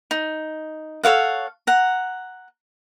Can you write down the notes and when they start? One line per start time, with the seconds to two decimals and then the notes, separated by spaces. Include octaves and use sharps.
0.11 D#4
1.03 A4 C#5 F5 F#5
1.67 F#5 A#5